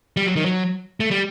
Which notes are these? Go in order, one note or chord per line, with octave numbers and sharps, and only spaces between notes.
G3
F#3
D#3
F#3
A3
G3